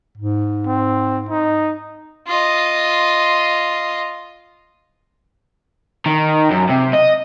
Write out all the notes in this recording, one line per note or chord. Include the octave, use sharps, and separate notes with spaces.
G#2
C4
D#4
F4 D#5
D#3
F#2
C3
D#5